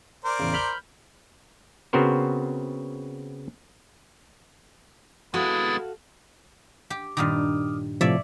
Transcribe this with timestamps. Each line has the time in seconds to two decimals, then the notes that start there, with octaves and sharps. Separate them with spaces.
0.25 A#4 C5 D5
0.39 A1 E2 C#3
0.54 B5 F6 G6
1.93 C#3 B3 C4 F#4 A#4 C5
5.34 G#3 B3 E4 F#4 A4 F5 A6
6.90 G4
7.17 G2 A#2 D#3 D6 D#6 F6
8.01 A2 C3 F3 C#5 D5 E5